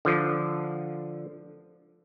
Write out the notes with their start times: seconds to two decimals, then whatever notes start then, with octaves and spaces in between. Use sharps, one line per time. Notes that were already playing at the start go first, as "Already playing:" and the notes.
0.05 D3 F3